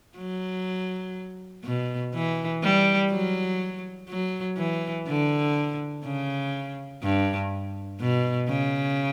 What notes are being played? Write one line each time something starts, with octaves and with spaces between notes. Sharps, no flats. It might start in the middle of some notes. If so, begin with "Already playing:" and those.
F#3
B2
E3
G3
F#3
F#3
E3
D3
C#3
G2
B2
C#3